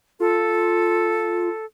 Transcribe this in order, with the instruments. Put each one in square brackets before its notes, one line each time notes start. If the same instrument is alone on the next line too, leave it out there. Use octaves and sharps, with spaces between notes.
[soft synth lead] F4 [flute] A4